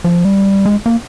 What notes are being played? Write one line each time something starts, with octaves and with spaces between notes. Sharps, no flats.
F3
G3
G#3
A#3